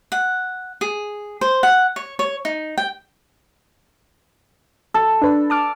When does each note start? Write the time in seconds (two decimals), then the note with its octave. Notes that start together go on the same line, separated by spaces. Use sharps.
0.12 F#5
0.81 G#4
1.41 C5
1.63 F#5
1.96 C#5
2.19 C#5
2.45 D#4
2.78 G5
4.94 A4
5.22 D4 B4
5.50 A5 D6 F6